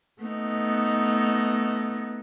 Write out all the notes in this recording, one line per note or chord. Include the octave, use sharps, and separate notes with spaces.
A3 B3 D#4